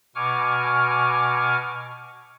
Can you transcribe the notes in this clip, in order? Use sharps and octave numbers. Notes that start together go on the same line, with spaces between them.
B2 G#5 C#6 D6 F6